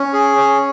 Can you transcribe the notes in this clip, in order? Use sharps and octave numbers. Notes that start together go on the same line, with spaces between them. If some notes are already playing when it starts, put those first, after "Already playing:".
Already playing: C#4
G#4
C#4